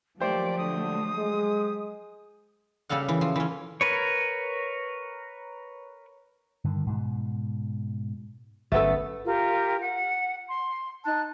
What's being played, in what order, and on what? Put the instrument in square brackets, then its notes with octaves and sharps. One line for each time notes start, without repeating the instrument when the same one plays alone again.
[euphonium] D#2 [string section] F3 F#3 A3 [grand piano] G4 C5 [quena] D5
[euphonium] D3 [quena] D#6
[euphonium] G#3
[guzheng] C#3 G3 A4 F5 F#5
E3
F3
E3 C#4
[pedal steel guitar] A#4 B4 C#5
[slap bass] G2 D3 D#3
G#2 B2
[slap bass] G1 C#4 [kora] A3 B3 A4
[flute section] F4 G4 A#4
F#5
C6
D#4 A5 F#6